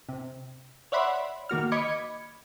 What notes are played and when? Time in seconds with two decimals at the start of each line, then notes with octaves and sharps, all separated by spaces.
0.09 C3
0.92 C#5 D5 E5 F#5 B5 C6
1.49 D#3 A#3 F#4 F6
1.72 D#5 B5 D6 G#6 C#7